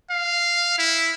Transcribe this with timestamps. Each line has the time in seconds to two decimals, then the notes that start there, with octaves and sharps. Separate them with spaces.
0.10 F5
0.78 E4